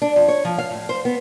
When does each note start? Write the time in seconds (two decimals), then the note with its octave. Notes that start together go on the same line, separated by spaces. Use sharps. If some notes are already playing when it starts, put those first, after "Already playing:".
0.02 D4
0.16 F2
0.28 C#5
0.45 F3
0.58 F5
0.71 A2
0.89 C5
1.05 B3